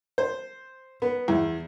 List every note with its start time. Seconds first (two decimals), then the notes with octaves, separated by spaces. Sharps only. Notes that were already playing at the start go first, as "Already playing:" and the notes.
0.18 C5
1.02 B3
1.28 E2